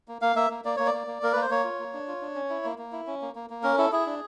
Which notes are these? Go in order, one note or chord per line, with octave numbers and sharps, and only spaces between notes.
A#3
A#3 F5
A#3 E5
A#3
A#3 D5
A#3 C#5
D5
A#3
A#3
A#3 A#4
A#3 B4
C5
A#3 C#5
F4
A#3
D4
F4
D4
C#4
E4
A#3
A#3
E4
C#4
A#3
A#3
A#3
C#4 A#4
E4 A4
E4 G#4
D4